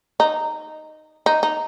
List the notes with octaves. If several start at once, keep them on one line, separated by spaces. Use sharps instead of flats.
D#4
D#4
D#4